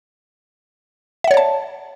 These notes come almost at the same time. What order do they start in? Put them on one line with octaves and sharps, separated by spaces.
E5 F#5 C#5 D5 A5